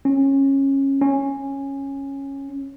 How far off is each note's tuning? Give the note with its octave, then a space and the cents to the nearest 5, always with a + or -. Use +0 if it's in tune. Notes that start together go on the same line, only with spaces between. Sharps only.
C#4 -20
C#4 -10